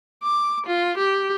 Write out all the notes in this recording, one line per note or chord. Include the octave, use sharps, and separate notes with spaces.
D6
F4
G4